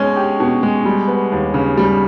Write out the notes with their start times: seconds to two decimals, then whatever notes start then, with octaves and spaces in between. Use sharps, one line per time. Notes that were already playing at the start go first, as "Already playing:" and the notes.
Already playing: B2 G#3 C#4
0.16 G4
0.40 B2
0.63 G#3
0.85 G3
1.08 B3
1.32 D#2
1.54 C#3
1.77 G3